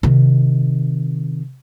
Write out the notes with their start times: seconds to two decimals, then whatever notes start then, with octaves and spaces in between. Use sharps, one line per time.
0.03 C3 D#3